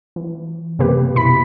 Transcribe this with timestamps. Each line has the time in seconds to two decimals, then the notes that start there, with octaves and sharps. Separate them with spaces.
0.16 E3
0.79 F#2 C3 A#3 G4 B4
1.15 B2 E4 B5 B6